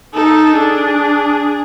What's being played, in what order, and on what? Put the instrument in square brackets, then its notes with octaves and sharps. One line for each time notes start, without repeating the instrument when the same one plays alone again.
[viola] D#4 [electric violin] A4
[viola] D4 [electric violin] G#4